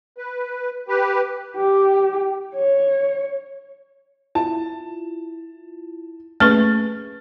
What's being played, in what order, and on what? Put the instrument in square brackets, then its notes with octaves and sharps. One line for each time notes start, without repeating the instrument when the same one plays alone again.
[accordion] B4
G4 B4
[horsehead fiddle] G4
C#5
[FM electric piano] E4 F4 [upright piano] A5
[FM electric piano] A3 A#3 G#4 [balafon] C#4 B4 C#6 [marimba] F6 [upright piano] A6